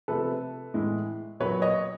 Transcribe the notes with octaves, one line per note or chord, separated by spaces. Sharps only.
C3 F3 A3 A4 B4
A2 E3 G#3
A#2 F#3 A#3 B4 C#5
C#5 D#5